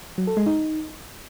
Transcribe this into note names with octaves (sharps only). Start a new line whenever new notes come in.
F#3
A4
G#3
D#4